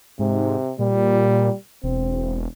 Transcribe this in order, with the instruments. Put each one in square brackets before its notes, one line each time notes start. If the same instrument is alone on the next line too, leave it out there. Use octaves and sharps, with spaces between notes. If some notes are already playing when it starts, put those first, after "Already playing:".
[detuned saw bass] G#2 [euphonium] C3
[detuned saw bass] A#2 [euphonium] G3
[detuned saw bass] E1 [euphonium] C4